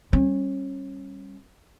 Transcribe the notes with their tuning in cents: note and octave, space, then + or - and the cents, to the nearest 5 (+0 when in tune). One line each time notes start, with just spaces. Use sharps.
G3 +0 C#4 -25